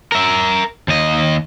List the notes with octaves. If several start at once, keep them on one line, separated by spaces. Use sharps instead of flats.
A#4 E5
D#2 D#5